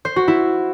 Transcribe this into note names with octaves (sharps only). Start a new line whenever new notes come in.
C5
F#4
E4